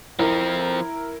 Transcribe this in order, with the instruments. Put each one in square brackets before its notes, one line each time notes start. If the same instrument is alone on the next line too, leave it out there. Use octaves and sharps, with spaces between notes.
[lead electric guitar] F3 C4 [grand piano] E4 A#4